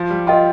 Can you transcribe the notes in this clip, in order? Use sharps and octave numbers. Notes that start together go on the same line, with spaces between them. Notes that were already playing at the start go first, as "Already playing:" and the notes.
Already playing: F3
G3
F4 A#4 D#5 G5 C6